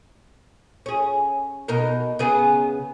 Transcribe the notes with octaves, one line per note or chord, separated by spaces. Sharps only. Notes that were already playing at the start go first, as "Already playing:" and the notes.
C#4 G#4
B2 D#4 A#4
C#3 B3 G#4